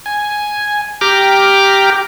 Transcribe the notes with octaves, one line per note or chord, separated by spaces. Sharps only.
G#5
G4 G5 A#5 D6 F6